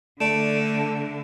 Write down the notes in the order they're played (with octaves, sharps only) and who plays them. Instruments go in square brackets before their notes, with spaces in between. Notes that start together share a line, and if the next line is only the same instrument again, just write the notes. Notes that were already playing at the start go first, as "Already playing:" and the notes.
[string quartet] D3 [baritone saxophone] A3 [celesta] D5 D7 E7